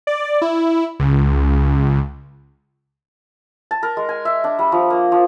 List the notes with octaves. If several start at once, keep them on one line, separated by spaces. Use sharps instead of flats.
D5
E4
C#2
A5
A#4
G#3
G#5
E5
D4
G3
F3
A#3
F3